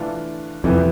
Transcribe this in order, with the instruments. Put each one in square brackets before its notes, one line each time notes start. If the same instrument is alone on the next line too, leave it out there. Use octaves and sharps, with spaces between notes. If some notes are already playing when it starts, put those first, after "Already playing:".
Already playing: [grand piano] E3 A3 D4 F4
[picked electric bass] F2 [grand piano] C3 E3 G3 B3